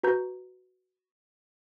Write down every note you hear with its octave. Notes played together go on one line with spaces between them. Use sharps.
F#4 B4 A#5 G6